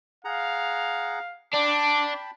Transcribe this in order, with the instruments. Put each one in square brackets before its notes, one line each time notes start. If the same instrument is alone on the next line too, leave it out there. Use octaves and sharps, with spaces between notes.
[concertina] G#4 F#5 A#5 [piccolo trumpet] F5
[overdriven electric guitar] D4 [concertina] G5 A5 B5 [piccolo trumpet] D6